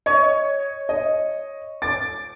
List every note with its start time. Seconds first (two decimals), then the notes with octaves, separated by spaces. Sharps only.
0.06 C#5 D#5
0.89 D#5
1.82 D6 A6